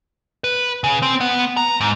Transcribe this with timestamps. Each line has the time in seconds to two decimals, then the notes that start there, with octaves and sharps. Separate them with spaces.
0.44 B4
0.84 C#3
1.02 C4
1.20 B3
1.57 A#5
1.81 G#2